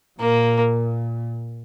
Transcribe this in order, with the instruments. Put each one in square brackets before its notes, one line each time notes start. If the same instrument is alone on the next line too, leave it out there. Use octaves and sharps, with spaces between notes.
[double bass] A#2 [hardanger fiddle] A#3